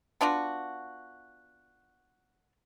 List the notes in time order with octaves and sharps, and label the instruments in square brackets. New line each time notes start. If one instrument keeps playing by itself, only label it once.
[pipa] B3 D4 F4 F#4